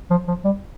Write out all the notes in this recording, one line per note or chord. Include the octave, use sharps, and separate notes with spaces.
F3
F3
G3